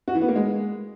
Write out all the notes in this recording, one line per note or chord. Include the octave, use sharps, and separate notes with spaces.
F#4
E3
B3
A#3
G#3